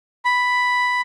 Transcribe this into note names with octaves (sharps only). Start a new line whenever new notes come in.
B5